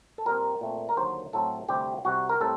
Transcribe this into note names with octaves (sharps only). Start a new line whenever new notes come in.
A4
A#2 G3 C4 A#4
A#2 A3 C4
A#4
D#2 D3 F#3 A#3 C5
A2 F#3 C4 A4
D2 C3 G3 C4 G4
C2 C3 G3 F#4
A#4
A2 G3 C4 A4